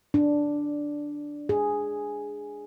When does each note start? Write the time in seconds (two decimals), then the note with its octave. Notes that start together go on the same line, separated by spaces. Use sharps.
0.14 D4
1.49 G#4